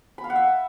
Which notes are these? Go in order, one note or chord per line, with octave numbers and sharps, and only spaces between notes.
B5
F5
F#5
E5